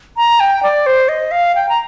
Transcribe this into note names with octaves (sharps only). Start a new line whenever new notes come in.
A#5
G5
D5
C5
D#5
F5
G5
A#5